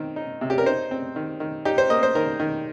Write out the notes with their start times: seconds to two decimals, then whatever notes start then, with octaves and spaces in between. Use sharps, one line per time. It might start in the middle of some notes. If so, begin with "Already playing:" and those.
Already playing: D#3 C4
0.16 D#4
0.41 C3
0.50 G4
0.58 A#4
0.66 D#4 C5
0.91 C4
1.16 D#3
1.40 D#3
1.65 D#4 G4
1.78 C5
1.90 A#3 D#5
2.03 C5
2.15 D#3 A#4
2.40 D#3